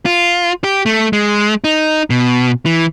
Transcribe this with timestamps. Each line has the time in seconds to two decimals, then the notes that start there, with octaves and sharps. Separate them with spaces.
0.05 F4
0.64 G4
0.86 A3
1.13 G#3
1.64 D#4
2.10 B2
2.66 E3